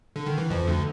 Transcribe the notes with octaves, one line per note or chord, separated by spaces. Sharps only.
D3
D#3
E3
F2 F3
D2 D3